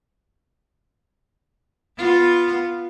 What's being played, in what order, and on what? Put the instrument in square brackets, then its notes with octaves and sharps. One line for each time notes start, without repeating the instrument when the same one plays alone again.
[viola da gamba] B3 F4